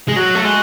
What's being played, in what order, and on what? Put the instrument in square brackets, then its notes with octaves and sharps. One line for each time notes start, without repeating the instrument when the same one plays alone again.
[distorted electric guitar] G#3
[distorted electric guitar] F#3 [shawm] F#4
[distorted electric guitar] A3
[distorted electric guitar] G#3 [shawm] F#4